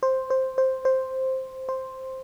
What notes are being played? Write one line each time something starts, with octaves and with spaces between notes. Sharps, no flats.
C5
C5
C5
C5
C5